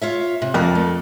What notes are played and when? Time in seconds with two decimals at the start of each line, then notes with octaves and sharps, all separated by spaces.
0.02 F4 C#5 E5
0.42 C3
0.54 F2 A#3 A#4 D5
0.75 A3